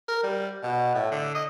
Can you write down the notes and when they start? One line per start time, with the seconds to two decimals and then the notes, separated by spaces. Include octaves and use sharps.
0.08 A#4
0.24 G3
0.63 B2
0.95 A2
1.11 D3
1.35 D#5